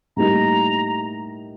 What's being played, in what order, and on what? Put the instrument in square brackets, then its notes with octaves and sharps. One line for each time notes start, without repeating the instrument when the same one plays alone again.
[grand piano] A2 G3 A#3 D#4 [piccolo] A#5